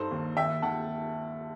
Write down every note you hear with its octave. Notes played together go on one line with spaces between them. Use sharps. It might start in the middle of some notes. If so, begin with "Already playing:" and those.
Already playing: G2 D#4 A4 C5
D#2
D#2 E5 G5
D#2 F#5 A5